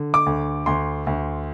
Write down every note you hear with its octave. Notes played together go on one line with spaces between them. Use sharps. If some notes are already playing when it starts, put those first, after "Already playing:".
Already playing: D3
D6
D2
D2 C6
D2